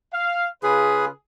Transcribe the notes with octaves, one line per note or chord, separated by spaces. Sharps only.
F5
C#3 F4 G#4 B4